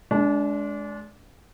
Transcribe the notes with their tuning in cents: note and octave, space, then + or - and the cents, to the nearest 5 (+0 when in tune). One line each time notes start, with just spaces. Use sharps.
G#3 +20 D4 -25